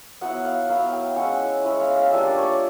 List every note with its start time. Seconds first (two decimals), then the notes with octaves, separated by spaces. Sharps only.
0.21 F#3 B3 E4 F#5
0.45 F5
0.69 F#3 B3 E4 F5
0.92 G5
1.16 G#3 C#4 E4 F#5
1.64 G#3 C#4 E4
1.80 F5
1.95 F5
2.11 G3 A#3 D4 F4 E5
2.27 D5
2.37 C#5
2.43 D5